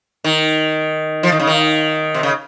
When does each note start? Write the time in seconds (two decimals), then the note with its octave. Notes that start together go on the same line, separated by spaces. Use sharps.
0.24 D#3
1.23 F3
1.32 D#3
1.40 C#3
1.47 D#3
2.14 C3
2.23 C#3